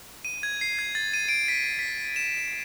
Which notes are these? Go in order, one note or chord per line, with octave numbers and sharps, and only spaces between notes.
D#7
G#6
C7
G#6
A6
D#7
D7
B6
B6
E7